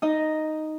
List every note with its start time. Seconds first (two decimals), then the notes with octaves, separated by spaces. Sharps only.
0.02 D#4 D#5